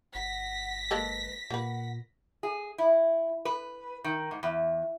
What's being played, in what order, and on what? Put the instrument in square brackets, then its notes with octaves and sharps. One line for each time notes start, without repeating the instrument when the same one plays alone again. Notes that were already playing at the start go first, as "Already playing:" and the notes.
[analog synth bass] G1 [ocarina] F#5 [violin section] A#6 B6
[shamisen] G#3 A#3 A4 [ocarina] B4
[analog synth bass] A#2 [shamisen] A#3 B4 [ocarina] F#5
[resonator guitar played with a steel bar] G#4
E4
B4
D#3
G#2
E2